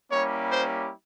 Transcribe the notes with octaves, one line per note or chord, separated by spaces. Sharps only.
G3 A#3 C#4 E4 G4 C#5
C5